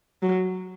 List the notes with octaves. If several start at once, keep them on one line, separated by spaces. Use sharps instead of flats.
F#3